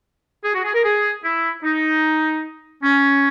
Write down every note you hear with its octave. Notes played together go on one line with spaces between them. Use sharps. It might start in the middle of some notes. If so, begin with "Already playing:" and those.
G#4
F#4
G#4
A#4
G#4
E4
D#4
C#4